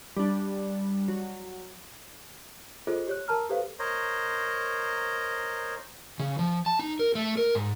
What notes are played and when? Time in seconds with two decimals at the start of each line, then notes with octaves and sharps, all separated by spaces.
0.17 G3 D4
1.08 F#3
2.87 F4 G#4 A4 C5 D#5
3.07 G4 C#5 F#6
3.28 A#4 A5 A#5 F6
3.49 G4 A4 B4 C5 F5
3.79 A#4 C5 C#5 D#5
6.20 C#3
6.39 F3
6.66 A5
6.79 D#4
6.99 A#4
7.15 A3
7.37 A#4
7.55 G#2